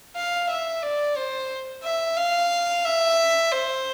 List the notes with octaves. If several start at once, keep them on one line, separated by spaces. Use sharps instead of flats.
F5
E5
D5
C5
E5
F5
E5
C5